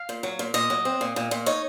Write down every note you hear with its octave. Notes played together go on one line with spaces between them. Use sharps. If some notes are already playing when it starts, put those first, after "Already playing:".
Already playing: F5
A#2
F#3
A#2
A#2 D#5
F#3
C4
A#2
A#2
A#2
D#4 C#5